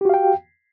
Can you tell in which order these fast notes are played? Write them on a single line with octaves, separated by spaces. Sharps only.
G4 F#4 F5 G5